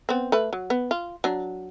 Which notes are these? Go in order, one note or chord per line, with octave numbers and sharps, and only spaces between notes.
B3 C4
A3 B4
F#3
B3
F4
F#3 D4